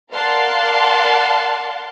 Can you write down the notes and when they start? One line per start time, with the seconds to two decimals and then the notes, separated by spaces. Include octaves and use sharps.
0.13 A#4 D5 F5 F#5 A5 C6